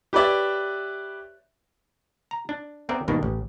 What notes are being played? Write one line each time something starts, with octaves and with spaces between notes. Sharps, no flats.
G4 B4 C#5 D5 E5
A#5
D4
B3 C4 G#4 A#4 D5 E5
G2 B2 D#3 A#3 C4 D4
A1